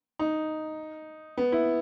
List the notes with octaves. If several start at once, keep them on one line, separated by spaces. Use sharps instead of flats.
D#4
B3
E4